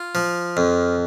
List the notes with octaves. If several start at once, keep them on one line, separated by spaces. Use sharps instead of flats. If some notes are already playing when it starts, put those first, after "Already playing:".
Already playing: F4
F3
F2